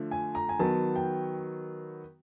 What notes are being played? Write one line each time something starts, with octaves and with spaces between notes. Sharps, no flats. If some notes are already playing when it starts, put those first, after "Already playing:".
Already playing: D3 F3 A3
G#5
A#5
G#5
D#3 F#3 B3 A5
G5